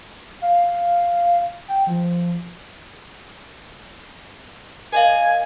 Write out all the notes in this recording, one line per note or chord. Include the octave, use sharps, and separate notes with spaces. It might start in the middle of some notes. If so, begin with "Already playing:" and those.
F5
G5
F3
A#4 D#5 F5 G#5